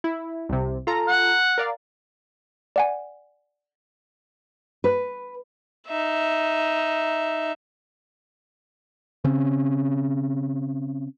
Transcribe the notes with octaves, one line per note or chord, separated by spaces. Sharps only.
E4
C2 C3
F4 A4 A#5
F#5
A#4 D5 F5
D5 F#5 G#5
B4
D#4 E5
C#3 C4 C#4